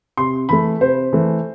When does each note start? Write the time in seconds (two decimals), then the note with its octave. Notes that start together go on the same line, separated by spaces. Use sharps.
0.17 C3 C6
0.49 E3 A3 B5
0.80 C3 C5
1.13 E3 A3